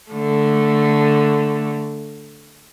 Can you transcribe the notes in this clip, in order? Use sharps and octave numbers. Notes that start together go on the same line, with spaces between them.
D3 A3